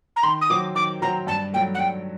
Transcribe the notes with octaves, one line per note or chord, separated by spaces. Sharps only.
A#5
D#3 C6
D#6
F#3 C4 F#4 C5 D6
D#3 D6
F#3 C4 F#4 C5 A#5
G2 A5
F#3 A3 G5
F#5
G2 G5